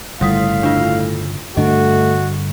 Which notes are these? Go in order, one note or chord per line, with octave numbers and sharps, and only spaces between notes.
G1 A2 C#3 G3 F5 D#6 B6
D4 F4
G2 D3 A3 D4 F#4 D#5